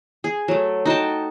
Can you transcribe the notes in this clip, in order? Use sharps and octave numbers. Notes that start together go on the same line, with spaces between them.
G#4
F#3 A3
D#4 F#4 G5 A5